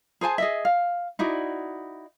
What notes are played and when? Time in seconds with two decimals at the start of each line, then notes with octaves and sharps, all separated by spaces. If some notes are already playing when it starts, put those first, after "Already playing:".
0.21 G#4 C5 G#5 A5
0.38 G#4 D#5 E5
0.65 F5
1.19 D#4 E4 F#4 D5